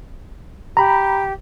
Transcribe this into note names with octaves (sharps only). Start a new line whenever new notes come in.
G4 A#5 B5